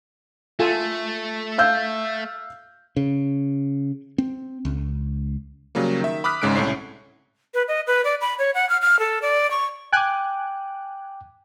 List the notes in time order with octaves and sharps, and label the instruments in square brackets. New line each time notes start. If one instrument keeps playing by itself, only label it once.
[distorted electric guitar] A3 [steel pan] F4 A4 G#5
[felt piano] F5 E6 G6
[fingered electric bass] C#3
C4
C#2
[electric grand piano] C#3 F#3 G3 A#3
D#3 E5
B5 D6 D#6 F6 F#6 B6
G#1 G#2 C#3 G#3 F#6 D7
C2 A2 C#4 C7
[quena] B4
D#5
B4
D5
B5
C#5
F#5
F6
F6
A4
D5
C#6
[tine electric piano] G5 D6 [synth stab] G#5 F#6